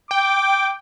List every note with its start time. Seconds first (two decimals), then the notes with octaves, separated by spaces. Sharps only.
0.11 G5 D6